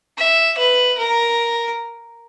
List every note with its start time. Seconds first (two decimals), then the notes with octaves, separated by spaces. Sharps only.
0.18 E5
0.58 B4
0.98 A#4